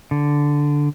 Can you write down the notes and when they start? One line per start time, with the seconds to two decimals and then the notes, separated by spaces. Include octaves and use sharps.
0.11 D3